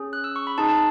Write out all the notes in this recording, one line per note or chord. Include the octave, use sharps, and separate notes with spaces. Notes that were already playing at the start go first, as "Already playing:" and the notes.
Already playing: C#4 G#4
F#6
E6
C#6
B5
D#4 G#4 A5
A5